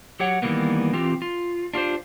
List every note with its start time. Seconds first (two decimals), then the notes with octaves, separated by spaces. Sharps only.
0.20 F#3 G4 C#5 F#5
0.42 D#3 E3 G3 A#3 B3
0.93 E3 C4 F4 G4
1.22 F4
1.74 D4 F4 G4 C5